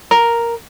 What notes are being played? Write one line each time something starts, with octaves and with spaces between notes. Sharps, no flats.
A#4